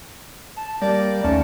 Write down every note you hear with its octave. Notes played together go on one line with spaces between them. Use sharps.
A5
G3 A#3 D5
D#2 A3 C#4 A5